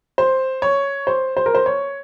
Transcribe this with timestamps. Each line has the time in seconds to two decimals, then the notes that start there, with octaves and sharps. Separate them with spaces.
0.18 C5
0.62 C#5
1.07 C5
1.37 C5
1.46 A#4
1.55 C5
1.66 C#5